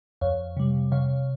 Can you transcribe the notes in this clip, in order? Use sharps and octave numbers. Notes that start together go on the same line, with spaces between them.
F2 C#5 F5
C3 G3
C3 C#5 F5